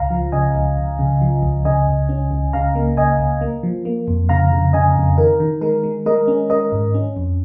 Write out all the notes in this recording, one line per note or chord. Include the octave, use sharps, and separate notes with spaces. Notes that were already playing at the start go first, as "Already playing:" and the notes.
Already playing: C#2 F5 A#5
F3
C#3 D#5 G#5
C#2
C#2
C#3
F3
C#2
C#3 D#5 G#5
C#2
C#4
C#2
C#3 F5 A#5
A#3
C#2 D#5 G#5
C#2
A#3
F3
A#3
F2
C#3 F5 A#5
C#3
C#3 D#5 G#5
F2
D#3 A#4
D#3
G#3 A#4
G#3
G#3 A#4 D#5
C#4
G#3 A#4 D#5
G#2
C#4
F2